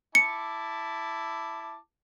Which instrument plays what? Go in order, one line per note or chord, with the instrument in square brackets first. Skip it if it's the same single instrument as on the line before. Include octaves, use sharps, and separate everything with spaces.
[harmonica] E4 A5 D6 [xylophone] C#7